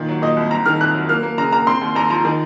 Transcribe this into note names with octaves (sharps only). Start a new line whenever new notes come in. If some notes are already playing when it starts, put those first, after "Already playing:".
Already playing: A#2 D#3
F#3
A#2 D#5
C2
C4 A#5
D#3 F6
F2 F#6
F#3
A#3 F6
A#3
C#3 A#5
A#3 A#5
C4 C6
D#2
D#2 A#5
F3 A#5
D#3